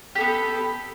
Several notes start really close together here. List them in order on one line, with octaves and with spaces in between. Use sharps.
G4 A4 B3